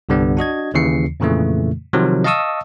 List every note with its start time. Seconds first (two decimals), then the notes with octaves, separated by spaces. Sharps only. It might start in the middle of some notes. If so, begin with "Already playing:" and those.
0.09 C2 G2 D3 G3 B3
0.37 D4 F#4 D#5 G#6
0.74 D#2 C#3 E3 C7 C#7
1.20 F2 A#2 C#3 E3 A3
1.93 C3 D#3 F3 F#3
2.24 D#5 F5 A5 C#6 D#6 E6